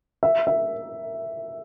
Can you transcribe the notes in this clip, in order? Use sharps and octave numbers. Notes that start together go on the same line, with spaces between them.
E5
E5